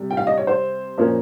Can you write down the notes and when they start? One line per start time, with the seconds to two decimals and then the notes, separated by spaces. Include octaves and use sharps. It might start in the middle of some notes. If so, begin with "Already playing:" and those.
Already playing: C3 G3
0.11 G5
0.17 F5
0.27 D#5
0.38 C#5
0.47 C5
0.98 A#2 F3 A#3 C#4